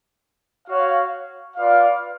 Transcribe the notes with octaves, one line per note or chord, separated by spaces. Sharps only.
F#4 C#5 F5
F4 B4 D5 F5